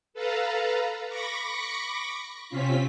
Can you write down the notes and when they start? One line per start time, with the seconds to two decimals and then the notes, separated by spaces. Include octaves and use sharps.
0.14 A4 B4 F5 A5 A#5
1.09 B5 C#6 D6 A#6 C#7
2.49 C3 C4 C#4 F4 B6